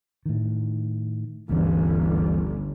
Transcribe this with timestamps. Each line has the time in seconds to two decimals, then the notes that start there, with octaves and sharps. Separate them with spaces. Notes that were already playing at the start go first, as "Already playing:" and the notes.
0.26 A2 D#3
1.49 G1 D2 E3 C#4